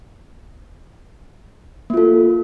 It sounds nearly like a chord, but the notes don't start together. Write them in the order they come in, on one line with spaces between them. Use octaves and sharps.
A#3 F4 A4